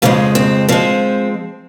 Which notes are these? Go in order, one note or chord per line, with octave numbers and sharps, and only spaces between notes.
F2 C#3 F3 G#3 A#3 C#4
C4
F3 G#3 C4